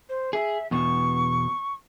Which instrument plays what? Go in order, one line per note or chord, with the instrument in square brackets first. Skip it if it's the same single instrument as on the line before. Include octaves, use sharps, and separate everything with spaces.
[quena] C5
[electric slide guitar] G#4 [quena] E5
[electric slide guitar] E2 B2 [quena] C#6